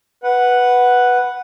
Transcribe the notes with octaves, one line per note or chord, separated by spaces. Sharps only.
B4 F#5